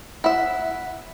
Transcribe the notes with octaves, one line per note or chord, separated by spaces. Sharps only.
E4 E5 F#5 B6